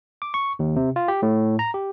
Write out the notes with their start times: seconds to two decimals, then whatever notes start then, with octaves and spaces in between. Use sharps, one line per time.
0.22 D6
0.34 C#6
0.59 D#2
0.76 C3
0.96 F4
1.08 G4
1.22 A2
1.59 A#5
1.74 G4